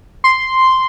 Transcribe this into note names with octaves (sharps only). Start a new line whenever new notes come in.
C6